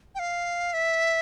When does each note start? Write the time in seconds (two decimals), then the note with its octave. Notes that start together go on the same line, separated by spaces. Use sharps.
0.15 G5
0.19 F5
0.73 E5